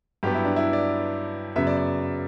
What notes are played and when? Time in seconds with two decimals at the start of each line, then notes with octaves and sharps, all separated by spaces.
0.23 G2 F#3 B3 G4
0.35 E4
0.45 D4
0.56 E4
0.73 D5
1.56 F#2 C#3 F#3 B3 E5
1.67 D5
1.77 D5